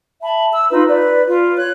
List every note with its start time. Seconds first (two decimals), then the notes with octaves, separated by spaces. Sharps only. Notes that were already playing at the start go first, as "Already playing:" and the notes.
0.22 E5 A5 B5
0.52 E6
0.71 D#4 F4 B4
0.87 B4 D5
1.28 F4
1.56 C#5 F#6